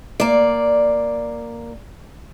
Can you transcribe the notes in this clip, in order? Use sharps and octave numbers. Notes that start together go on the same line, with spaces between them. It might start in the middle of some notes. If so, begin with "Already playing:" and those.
A#3 D5